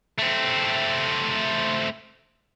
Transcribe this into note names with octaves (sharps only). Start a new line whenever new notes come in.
A3 C4